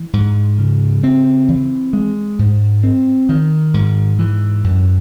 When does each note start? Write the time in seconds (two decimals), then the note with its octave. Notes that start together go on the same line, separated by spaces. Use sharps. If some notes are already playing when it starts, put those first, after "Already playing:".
Already playing: E3
0.13 G#2
0.59 C#3
1.03 C4
1.48 E3
1.93 G#3
2.39 G#2
2.83 C4
3.29 D#3
3.74 G#2
4.19 E3
4.64 F#2